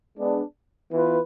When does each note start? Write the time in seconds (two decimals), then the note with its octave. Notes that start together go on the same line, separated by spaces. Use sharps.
0.16 G#3 B3 D4 G#4
0.92 E3 B3 F4 B4